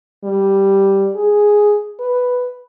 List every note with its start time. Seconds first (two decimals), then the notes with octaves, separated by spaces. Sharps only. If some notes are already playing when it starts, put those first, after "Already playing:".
0.24 G3
1.16 G#4
2.00 B4